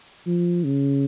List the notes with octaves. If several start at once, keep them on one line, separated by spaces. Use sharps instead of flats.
F3
C#3